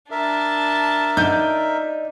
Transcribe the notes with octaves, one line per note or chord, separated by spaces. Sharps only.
D4 A#4 E5 A5
D#4 D5 G6